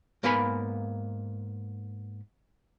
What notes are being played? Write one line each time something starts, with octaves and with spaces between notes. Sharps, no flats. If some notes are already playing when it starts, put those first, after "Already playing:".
G#2 A#3 B3 F5 G#5 B5